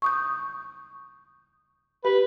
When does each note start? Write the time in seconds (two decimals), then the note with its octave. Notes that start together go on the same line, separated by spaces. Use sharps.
0.02 C#6 D#6 G6
2.05 G4 B4